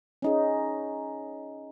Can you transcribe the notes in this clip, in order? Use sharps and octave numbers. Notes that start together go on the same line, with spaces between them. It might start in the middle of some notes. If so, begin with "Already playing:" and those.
C#4 D#4 G#4